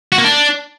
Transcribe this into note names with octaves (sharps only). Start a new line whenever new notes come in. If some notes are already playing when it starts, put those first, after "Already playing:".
F#4
A#3
D4